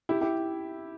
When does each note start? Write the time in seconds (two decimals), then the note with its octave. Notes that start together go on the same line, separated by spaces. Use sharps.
0.09 E4 G4
0.21 E4 G4